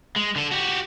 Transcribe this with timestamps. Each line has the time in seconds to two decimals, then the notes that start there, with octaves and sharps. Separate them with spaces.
0.16 G#3
0.36 D3 A4
0.51 F#4 G4